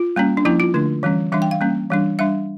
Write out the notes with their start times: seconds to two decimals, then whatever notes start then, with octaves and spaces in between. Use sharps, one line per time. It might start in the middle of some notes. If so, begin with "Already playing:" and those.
Already playing: F4
0.16 G3 A#3 C#4
0.37 D4
0.45 F3 A#3 C#4 E4
0.60 F4
0.74 D3 A3 D4
1.03 E3 G3 C#4
1.32 E3 G3 D4 E5
1.42 G5
1.51 F5
1.61 G3 A#3 C#4
1.90 E3 G3 D4
2.19 G3 D4 E5